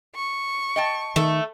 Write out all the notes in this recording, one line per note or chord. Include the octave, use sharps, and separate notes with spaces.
C#6
D#5 G5 A5
D#3 A3